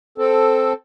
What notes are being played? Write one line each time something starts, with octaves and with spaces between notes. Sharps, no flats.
C4 A4